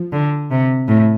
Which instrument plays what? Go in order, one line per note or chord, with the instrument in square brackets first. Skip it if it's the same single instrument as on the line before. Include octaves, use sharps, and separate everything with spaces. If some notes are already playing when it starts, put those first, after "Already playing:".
Already playing: [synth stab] F3
[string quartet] D3
C3
A2